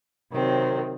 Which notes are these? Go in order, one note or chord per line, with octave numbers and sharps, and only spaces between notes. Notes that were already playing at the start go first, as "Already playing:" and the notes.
C3 D#3 F#3 C4